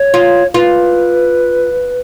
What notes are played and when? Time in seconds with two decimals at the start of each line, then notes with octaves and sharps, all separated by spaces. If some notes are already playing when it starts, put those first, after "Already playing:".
Already playing: C#5
0.14 F4
0.54 F4 B4